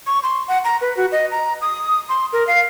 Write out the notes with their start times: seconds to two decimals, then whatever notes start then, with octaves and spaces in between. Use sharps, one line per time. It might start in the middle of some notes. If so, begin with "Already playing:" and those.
0.07 C#6
0.23 C6
0.48 F#5
0.64 A#5
0.81 B4
0.97 F#4
1.12 D#5
1.31 A#5
1.61 D#6
2.09 C6
2.33 A#4
2.47 F5